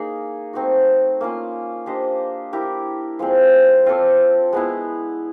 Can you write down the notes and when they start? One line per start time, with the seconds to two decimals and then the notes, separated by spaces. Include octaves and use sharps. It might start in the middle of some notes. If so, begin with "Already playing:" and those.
Already playing: A#3 D#4 G#4
0.53 A3 C4 D#4 F#4
1.21 A#3 C#4 F4
1.86 D4 G4 C5 D#5
2.53 E4 G4 A#4
3.19 F3 G#3 C4
3.86 C4 F4 A4 D5
4.53 G#3 B3 E4